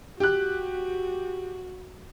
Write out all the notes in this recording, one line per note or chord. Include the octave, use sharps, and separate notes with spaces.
F#4 G4 F#6